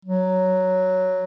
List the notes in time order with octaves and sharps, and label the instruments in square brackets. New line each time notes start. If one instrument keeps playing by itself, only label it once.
[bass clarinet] F#3